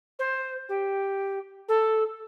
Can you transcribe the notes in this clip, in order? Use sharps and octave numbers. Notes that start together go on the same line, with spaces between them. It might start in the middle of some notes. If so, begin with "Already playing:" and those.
C5
G4
A4